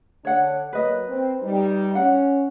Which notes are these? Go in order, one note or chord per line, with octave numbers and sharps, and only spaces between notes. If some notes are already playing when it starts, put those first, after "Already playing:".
D3 D4 C#5 F#5
F#3 A#3 B4 D#5
C4
G3 D#4
C#4 F#5